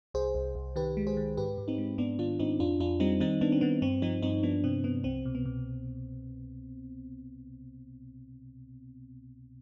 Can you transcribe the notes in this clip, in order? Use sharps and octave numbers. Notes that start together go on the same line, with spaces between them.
C2 G#4 C5
C2
C2
D#3 G4 B4
G#3
G#4 C5
D#3
G#2 G4 B4
G#2
C4 D#4
G#3
G#2 B3 D4
D#3 D4 F4
G#2 C4 D#4
F2 D4 F4
F2 D4 F4
G3 C4 D#4
D#3 C4 D#4
D#3 B3 D4
C4
D#3 B3
G2 C4
F3 C4 D#4
G2 C4 D#4
F3 B3 D4
C3 C4
C3 B3
C2 C4
B2
B3
B2